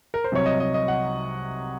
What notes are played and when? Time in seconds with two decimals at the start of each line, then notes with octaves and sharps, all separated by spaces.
0.14 A#4
0.24 C5
0.32 C2 C3 F#3 C#5
0.46 D#5
0.60 D#5
0.74 D#5
0.88 F#5